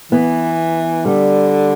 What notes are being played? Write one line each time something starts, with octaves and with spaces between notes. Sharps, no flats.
E3 B3
D3 G3